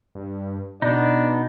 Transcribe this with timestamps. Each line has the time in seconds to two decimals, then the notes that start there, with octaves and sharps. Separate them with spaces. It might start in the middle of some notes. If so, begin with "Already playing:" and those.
0.15 G2
0.82 B2 B3 D4 D#4